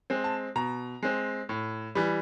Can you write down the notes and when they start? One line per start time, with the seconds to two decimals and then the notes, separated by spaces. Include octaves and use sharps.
0.10 G#3 C4
0.24 A5
0.56 B2 A#5
1.03 G#3 C4
1.49 A2
1.95 E3 G3